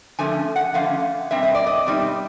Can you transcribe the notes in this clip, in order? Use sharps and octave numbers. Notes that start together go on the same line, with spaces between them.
D3 F3 A3 C#4 G#5
F#5
D3 F3 A3 C#4 F5
B2 G3 C4 E5
D#5
D5
D#5
B2 G3 C4 D#4